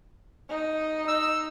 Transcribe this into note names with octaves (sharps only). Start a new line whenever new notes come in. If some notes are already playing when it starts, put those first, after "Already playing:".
D#4
D#4 E6